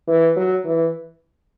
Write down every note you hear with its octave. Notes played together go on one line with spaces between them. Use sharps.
E3
F#3
E3